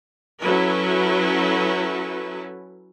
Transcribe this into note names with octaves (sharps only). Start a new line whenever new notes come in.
F#3 C#4 E4 A4 B4